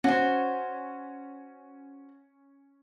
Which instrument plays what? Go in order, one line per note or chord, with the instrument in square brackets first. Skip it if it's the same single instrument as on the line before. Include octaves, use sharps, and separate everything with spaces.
[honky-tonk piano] C#4 [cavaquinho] F#4 C5